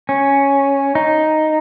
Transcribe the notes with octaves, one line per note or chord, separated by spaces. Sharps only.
C#4
D#4